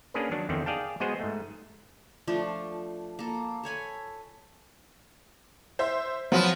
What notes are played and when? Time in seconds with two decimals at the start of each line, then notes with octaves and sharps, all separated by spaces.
0.14 A#3 C#4 D4 G#4 A#4 B4
0.31 D#3 F#3 D4
0.49 E2 D3 D#3 C4
0.66 G#4 D5 F5 G5 A5
1.00 G#3 B3 F#4 G#4 C5 D#5
1.20 G#2 A3
2.27 F3 A3 D4 F4
3.19 A#3 A4
3.63 A4 C#5 G#5 B5
5.79 C5 E5
6.32 F3 F#3 B3